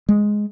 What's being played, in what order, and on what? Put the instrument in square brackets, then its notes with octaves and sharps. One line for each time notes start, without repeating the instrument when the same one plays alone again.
[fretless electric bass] G#3